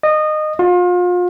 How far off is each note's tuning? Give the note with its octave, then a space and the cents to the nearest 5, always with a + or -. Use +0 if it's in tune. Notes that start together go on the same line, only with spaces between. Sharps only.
D#5 -20
F4 +35